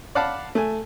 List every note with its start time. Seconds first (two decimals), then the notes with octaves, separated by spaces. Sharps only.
0.15 D5 F5 F#5 A5 B5 D6
0.55 A3 G#5